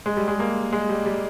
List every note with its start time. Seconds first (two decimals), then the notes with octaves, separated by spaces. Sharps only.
0.06 G#3
0.17 G3
0.28 G#3
0.39 A#3
0.73 G#3
0.89 G3
1.06 G3